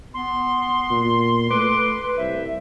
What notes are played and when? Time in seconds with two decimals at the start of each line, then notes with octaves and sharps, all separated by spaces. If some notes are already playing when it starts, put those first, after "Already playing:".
0.14 B3 C6
0.90 A#2
1.50 A3 B4 D6
2.17 C2 C5 E5